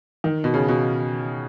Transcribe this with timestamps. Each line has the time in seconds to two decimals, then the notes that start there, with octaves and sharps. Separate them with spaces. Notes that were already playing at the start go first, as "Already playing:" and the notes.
0.24 D#3
0.44 B2
0.54 C#3
0.68 B2